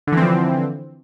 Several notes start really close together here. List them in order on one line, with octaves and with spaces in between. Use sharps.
D3 E3 C4 F3